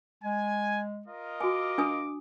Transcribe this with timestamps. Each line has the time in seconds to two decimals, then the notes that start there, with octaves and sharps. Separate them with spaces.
0.23 G#3 G#5
1.06 F4 A#4 D#5
1.41 F#4 G#5 D6
1.78 D4 G#5 D#6